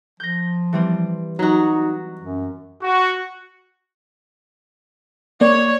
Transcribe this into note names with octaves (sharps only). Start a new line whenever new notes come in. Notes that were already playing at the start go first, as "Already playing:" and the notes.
F3 G6 A#6
E3 G3 C4
F#3 D#4 F#4
F#2
F#4
A#3 C#5 D5